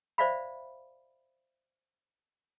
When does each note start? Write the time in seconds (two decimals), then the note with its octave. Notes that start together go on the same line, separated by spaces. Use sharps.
0.18 C5 D5 E5 F5 B5